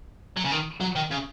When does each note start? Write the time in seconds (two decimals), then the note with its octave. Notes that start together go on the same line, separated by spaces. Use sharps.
0.37 F#3
0.45 C#3
0.52 D#3
0.81 F#3
0.95 D#3
1.11 C#3